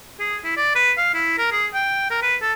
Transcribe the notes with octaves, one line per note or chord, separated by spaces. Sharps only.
G#4
E4
D5
B4
F5
E4
A#4
G#4
G5
A#4
B4
A4